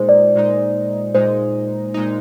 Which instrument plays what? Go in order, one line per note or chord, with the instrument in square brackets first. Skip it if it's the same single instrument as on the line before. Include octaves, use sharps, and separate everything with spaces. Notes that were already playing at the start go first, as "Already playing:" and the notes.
Already playing: [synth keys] A#2 G#3 D#4 [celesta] C5
[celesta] D5
[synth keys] A#2 G#3 D#4
[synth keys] A#2 G#3 D#4 [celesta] C5
[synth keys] A#2 G#3 D#4